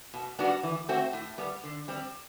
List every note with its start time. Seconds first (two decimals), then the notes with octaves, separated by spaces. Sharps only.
0.14 B2
0.39 G3 B3 D4 F#4
0.63 E3
0.89 A3 C4 F#4
1.13 A2
1.38 G3 B3
1.64 D3
1.88 G3 C4